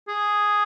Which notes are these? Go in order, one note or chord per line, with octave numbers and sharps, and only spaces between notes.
G#4